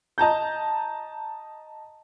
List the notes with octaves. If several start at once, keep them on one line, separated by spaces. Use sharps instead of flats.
D#5 A5 A#5 G6